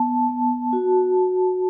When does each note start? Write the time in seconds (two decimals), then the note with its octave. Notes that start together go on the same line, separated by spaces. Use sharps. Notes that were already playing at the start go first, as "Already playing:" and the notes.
Already playing: B3 A5
0.29 B3
0.73 F#4
1.17 F#4